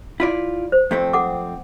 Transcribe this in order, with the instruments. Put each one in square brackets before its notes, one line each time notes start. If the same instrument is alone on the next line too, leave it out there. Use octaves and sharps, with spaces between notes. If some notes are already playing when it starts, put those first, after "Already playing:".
[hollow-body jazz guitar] E4 F4 D5
[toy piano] C5
[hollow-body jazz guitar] F2 A3 C4
[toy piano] A4 F#5 D6